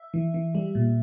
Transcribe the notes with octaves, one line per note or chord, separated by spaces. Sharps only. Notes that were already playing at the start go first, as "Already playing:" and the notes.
Already playing: E5
E3
E3
G3
A#2